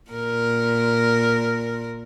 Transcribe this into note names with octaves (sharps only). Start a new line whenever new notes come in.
A#2 A#4